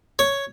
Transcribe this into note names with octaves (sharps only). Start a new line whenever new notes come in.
C#5